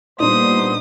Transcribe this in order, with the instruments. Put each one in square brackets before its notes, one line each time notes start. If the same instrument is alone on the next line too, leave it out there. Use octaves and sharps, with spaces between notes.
[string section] A#2 [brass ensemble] G3 B3 C5 [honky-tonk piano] D4 D#4 [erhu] D#6